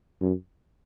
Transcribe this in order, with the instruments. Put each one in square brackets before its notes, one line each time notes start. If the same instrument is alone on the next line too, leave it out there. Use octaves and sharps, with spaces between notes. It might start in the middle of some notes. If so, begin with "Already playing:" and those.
[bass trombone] F#2